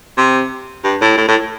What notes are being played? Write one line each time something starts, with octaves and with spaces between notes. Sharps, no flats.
C3
G2
A2
A2
A2